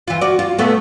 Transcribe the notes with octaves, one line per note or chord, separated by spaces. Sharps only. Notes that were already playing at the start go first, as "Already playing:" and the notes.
E3 F4
F#4 D5
F4
A#2 A3 B3